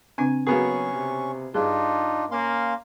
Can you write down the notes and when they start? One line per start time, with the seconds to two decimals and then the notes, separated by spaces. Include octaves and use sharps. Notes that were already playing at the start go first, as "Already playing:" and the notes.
0.18 C#3 C4 D4 G#5
0.47 F#3 A#3 B3 C#4 F#4 G#4 A#4 C#6
0.94 C3
1.54 G2 D4 D#4 F4 G#4
2.31 A#3 C#4 F5 C6